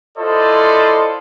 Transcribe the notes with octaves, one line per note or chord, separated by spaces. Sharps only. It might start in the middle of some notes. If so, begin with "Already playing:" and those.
E4 F4 A4 C5 D5 D#5